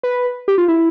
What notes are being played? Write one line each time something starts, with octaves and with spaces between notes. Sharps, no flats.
B4
G4
F4
E4